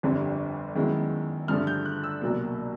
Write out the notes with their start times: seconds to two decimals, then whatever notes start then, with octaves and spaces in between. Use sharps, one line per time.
0.03 G1 F2 D3 G3 C4
0.75 F#2 D#3 G#3 B3 E4
1.48 G2 D3 F3 A3 F6
1.67 G6
1.85 F#6
2.03 E6
2.22 C2 B2 F#3 A#3